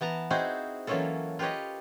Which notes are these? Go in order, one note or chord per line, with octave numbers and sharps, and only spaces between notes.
E3 B3 A5 A#5
C4 D#4 E4 F#4 G#4 C5
E3 F#3 A#3 C#4 F4 A4
F4 G4 B4 C#5 D#5